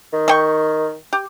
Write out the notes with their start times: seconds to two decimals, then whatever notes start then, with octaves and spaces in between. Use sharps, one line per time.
0.13 D#3
0.28 A3 G5 C#6
1.13 G4